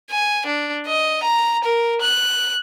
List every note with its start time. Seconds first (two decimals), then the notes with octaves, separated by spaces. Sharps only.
0.11 G#5
0.46 D4
0.87 D#5
1.23 A#5
1.64 A#4
2.01 F#6